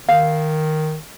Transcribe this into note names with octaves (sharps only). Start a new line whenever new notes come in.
D#3 F5